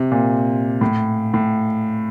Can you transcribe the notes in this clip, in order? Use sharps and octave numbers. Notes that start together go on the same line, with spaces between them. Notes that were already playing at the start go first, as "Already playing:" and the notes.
Already playing: C3
A#2
A2
A2